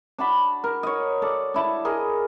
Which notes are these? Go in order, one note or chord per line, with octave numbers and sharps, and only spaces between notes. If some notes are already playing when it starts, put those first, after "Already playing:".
D4 F#4 A5 B5
A#4
C#5 D#5
A4 D5
D4 E4 A5
G#4 A#4 D#5